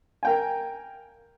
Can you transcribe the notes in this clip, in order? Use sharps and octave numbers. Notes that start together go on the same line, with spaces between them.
A#4 G5 G#5